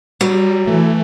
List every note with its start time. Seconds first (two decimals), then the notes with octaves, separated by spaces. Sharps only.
0.21 F#3 G3
0.67 E3 A3